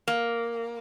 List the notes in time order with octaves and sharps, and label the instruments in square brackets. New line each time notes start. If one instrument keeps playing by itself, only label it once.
[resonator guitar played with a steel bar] A#3